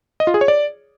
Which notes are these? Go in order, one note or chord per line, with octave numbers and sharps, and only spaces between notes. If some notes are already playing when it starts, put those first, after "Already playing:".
D#5
F4
G#4
C#5
D5